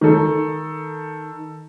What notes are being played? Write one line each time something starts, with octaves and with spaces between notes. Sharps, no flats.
D#3 A4